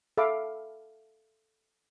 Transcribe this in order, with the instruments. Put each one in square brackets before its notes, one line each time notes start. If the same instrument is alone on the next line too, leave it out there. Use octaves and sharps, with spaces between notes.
[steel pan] A4 E5 F5 B5 D6